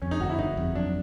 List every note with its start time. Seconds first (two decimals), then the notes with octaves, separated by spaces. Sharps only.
0.02 F2 C#4
0.11 D#4
0.20 G1 F#4
0.29 E4
0.39 G1 D#4
0.57 F2
0.75 F#3 D4